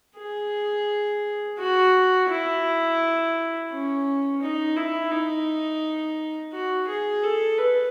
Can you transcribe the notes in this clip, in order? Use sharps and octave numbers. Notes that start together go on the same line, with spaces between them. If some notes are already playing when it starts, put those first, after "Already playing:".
G#4
F#4
E4
C#4
D#4
E4
D#4
F#4
G#4
A4
B4